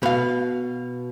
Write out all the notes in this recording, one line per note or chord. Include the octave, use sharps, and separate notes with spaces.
B2 F5